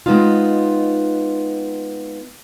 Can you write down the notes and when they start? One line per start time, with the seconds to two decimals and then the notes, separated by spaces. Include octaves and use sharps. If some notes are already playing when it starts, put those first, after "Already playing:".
0.06 G#3 B3 C4 D#4 F4